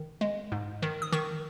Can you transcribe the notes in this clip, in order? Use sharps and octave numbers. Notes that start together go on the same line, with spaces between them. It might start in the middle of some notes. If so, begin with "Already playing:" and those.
Already playing: D#3
G#3
G#2
D#3
D#6
D#3 C#6